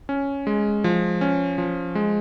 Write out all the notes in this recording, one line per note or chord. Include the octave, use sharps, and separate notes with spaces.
C#4
G#3
F3
C#4
F3
G#3